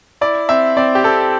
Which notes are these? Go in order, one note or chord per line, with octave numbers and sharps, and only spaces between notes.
E4 D5
C4 E5
C4 D5
G4
C4 A4